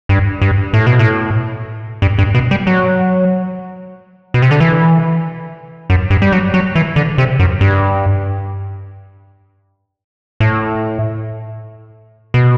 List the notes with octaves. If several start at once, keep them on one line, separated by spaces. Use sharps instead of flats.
G2
G2
A2
B2
A2
G2
G2
B2
G3
F#3
B2
C3
D3
E3
F#2
G2
G3
F#3
F#3
E3
D3
C3
F#2
G2
A2
B2